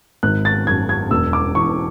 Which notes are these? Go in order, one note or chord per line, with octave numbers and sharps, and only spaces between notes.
G#1 F#6
A6
F#2 G#6
G#6
E1 E6
D6
E2 C#6